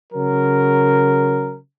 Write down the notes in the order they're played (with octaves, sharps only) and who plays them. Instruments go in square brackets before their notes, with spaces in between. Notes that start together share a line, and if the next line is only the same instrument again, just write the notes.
[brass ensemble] C#3 F#3 A#4